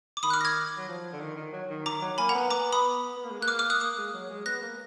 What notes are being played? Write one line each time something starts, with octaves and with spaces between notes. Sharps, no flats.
D6
D#3 B5 D#6
F#6
D6 F6
A#6
F6 G#6
F#3
F3
D3
D#3
D#3
F#3
D#3
D#3 A#5 D6
F#3
A#3 G#5 B5
F#5 A#5
B3
A#5 D6
B5 D#6
B3
A#3
G#3
A#3 F#6
D6 F6
D6 F6
D#6 F#6
A#3 D#6 F#6
G#3
F#3
G#3
B3 F#6 A#6
A#3